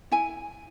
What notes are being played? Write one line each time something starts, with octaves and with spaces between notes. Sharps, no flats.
E4 G#5